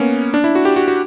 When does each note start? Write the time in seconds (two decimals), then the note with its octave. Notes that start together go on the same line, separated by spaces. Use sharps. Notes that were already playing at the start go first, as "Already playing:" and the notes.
Already playing: A#3 B3 C#4
0.34 D4
0.44 E4
0.55 F#4
0.65 G4
0.76 F#4
0.88 F#4